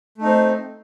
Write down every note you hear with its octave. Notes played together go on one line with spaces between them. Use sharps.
A3 C4 D#4